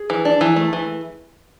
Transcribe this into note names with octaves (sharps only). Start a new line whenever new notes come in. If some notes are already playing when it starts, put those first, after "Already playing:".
Already playing: G#4
E3
D4
E3
A3
E3